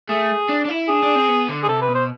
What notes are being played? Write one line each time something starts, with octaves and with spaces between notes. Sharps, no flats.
A3 G#4
D4
D4
E4
D4 G#4
D4
C4
B3
D3
G#4
C3 A4
B4
B2
C5